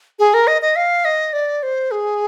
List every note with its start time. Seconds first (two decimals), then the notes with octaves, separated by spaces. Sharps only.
0.19 G#4
0.34 A#4
0.47 D#5
0.62 D#5
0.76 F5
1.05 D#5
1.33 D5
1.63 C5
1.91 G#4